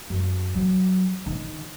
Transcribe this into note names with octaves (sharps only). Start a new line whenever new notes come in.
F#2
F#3
D#3